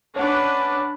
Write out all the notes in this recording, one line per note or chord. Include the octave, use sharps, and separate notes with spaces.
C#4 D4 B4 C#5 F#5